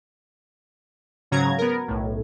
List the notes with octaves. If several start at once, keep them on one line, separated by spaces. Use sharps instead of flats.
G#2 C#3 F#3 A#5 G#6
B3 A#4
B1 A2